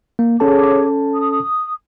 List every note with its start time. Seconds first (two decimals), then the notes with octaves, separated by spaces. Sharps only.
0.19 A#3
0.40 C#4 G#4 A4 C#5 A5 D6
1.14 D#6